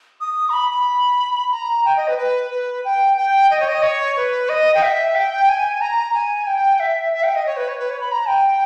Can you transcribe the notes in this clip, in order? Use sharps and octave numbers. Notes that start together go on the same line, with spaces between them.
D#6
A#5
B5
B5
A#5
G5
D#5
B4
B4
B4
G5
G5
D#5
C#5
D#5
C#5
B4
D#5
G5
E5
G5
G#5
A#5
G#5
G5
E5
E5
G5
D#5
C#5
B4
C#5
B4
C#5
B5
A#5
G5